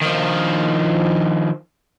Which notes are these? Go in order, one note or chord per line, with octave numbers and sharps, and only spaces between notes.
D#3 F3